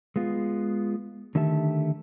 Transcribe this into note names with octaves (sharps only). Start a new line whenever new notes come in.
G#3 B3 F4
D3 D#3 A3 G4 E5 A5